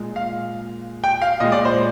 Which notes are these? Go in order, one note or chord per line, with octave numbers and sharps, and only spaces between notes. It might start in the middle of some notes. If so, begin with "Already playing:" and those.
Already playing: A#2 G#3
F5
G5
F5
A#2 G#3 D#5
D5
C5